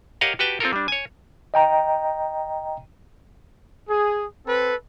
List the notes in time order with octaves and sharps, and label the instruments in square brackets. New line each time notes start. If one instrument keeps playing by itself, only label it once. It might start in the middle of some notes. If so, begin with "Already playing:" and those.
[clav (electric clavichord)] G4 A#4 C#5 D#5 F5 F#5
F#4 G4 B4 G5 A5
C4 F4 A4 A#4
G3 D4
C#5 G#5
[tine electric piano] D#5 G5 A#5
[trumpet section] G#4
C4 A4 B4